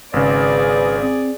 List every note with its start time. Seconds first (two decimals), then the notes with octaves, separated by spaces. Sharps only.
0.13 G#1 C#3 G#4 B4 D5
1.01 C4